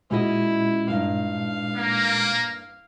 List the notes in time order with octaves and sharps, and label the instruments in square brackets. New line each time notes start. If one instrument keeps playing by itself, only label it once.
[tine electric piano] A#2 G#3 [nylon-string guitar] C#4 F#4 D#5 [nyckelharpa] E4
[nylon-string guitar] G2 D#4 [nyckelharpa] F5
[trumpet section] A#3